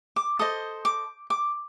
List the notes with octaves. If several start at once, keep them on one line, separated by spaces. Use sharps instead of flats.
D6
A4 C5 D#5 D#6
D6
D6